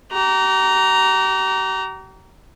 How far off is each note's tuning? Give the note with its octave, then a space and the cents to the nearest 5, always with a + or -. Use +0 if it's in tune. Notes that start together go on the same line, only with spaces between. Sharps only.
G4 -40 A#5 +0